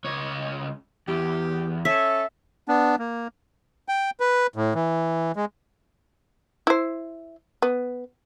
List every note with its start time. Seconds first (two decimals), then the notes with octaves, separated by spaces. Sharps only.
0.04 C#2 C#5
1.08 E2 G4
1.85 C#4 A4 C#5 E5
2.68 B3 D4
2.99 A#3
3.89 G5
4.20 B4
4.56 A2
4.75 E3
5.36 G#3
6.67 E4 C5
7.62 B3